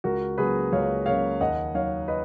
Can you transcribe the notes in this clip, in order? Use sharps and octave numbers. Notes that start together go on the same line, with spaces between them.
C#2 F#4 A#4
C#3 F#3 A#3 G#4 B4
C#2 C#5 F5
C#3 F#3 A#3 C#5 F5
D#2 D#5 F#5
D#3 F#3 C#5 F5
B4 D#5